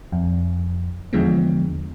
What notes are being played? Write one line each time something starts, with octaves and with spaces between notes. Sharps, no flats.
F2
E2 D3 F3 G#3 B3